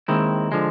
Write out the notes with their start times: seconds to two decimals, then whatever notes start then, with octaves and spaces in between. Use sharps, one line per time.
0.08 D#2 D#3 G#3 C4 E4
0.52 D3 F3 G#3